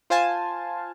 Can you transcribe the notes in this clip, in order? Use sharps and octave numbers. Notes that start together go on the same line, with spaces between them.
F4 C5 F5 G#5 A5